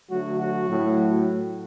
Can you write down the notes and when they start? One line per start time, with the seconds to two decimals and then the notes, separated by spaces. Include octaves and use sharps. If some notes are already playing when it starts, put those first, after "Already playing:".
0.10 D3 F#3 A3 F#4
0.39 F#4
0.68 A2 F#3 A3